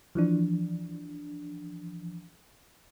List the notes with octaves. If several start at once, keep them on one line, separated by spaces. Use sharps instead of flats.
E3 F3 D4